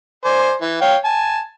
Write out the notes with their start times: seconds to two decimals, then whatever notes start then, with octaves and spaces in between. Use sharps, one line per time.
0.25 C5 D5 G#5
0.62 E3
0.81 C#5 F5 G5
1.05 G#5 A5